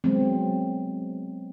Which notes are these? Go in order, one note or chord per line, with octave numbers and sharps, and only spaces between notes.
F#3 G#3 B3 C4